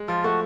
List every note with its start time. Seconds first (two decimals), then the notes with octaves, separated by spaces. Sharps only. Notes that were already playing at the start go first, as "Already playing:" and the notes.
Already playing: G#3
0.08 F3 F4
0.24 A3 F#4